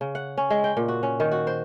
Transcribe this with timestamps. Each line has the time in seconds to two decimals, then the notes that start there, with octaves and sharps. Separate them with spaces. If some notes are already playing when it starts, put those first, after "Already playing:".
0.01 C#3
0.15 F#5
0.37 C#4
0.50 G#3
0.64 G5
0.77 A#2
0.88 F#4
1.03 C#4
1.20 D#3
1.31 F#4
1.47 C5